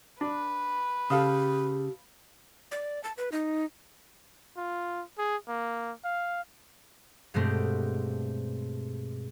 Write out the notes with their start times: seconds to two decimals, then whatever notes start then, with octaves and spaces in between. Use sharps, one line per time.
0.21 D4 B4
1.10 C#3 G4 A4 F5 D#6
2.71 D5
3.04 A5
3.18 B4
3.32 D#4
4.57 F4
5.18 G#4
5.48 A#3
6.04 F5
7.34 G2 B2 G#3 A3 C4 G4